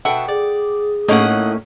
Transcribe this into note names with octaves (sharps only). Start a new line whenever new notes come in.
B2 A4 E5 F#5 G5
G#4 D5
A2 A3 A#3 C#4 D#4 D#5 F#5